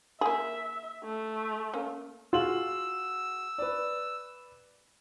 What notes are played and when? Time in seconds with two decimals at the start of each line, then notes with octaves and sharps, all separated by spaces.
0.21 A#3 G#4 E5
1.04 A3
1.73 A#3 C#4
2.33 F4 F#4 G#4 E6 F#7
3.58 B4 D5